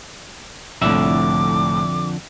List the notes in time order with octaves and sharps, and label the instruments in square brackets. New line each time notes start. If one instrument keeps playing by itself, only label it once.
[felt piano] C2 A2 [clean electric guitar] F2 D3 E5 [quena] D6